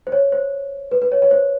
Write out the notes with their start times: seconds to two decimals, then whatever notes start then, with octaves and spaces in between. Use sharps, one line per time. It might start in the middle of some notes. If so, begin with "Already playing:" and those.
0.07 C5
0.12 C#5
0.32 C5
0.91 B4
1.02 B4
1.12 C#5
1.22 C#5
1.31 C5